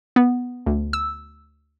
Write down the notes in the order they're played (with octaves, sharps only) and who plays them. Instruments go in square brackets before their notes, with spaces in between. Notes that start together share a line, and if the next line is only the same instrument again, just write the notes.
[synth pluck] B3
D2
E6